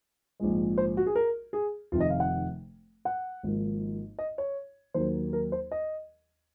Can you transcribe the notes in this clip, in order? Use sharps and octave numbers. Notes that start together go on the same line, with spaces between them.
A#1 G#2 F3 G#3
C5
F#4
G#4
A#4
G#4
F1 F2 C3 D#3 F4
D#5
F5
F#5
F#5
G#1 G#2 F3 A#3
D#5
C#5
D#2 D#3 F#3 A#3 C5
A#4
C5
D#5